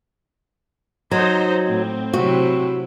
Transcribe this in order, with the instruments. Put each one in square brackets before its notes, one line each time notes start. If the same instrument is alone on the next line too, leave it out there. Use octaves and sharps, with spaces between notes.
[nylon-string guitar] F#3 [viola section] D#4 C5 D#5
[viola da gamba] A2 [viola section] C4
[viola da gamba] C3 F#3 E4 [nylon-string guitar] F#4